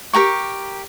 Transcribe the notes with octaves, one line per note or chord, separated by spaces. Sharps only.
G4 A#4 G5 C#6